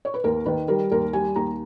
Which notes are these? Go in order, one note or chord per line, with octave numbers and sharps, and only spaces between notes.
C#5
B4
D#2 A#4
D#3 B4
G3 A#4
D#2 A#4
G3 G#5
D#2 A#5